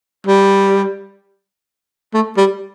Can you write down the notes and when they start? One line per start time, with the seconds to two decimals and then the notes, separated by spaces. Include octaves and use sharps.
0.27 G3
2.14 A3
2.37 G3